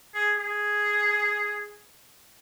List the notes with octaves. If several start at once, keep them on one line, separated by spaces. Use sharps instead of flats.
G#4
G#4